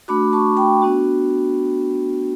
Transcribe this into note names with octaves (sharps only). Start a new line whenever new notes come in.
A3 D4 F#4 B5 D6
A5 C#6
G5 B5
B3 D4 F#4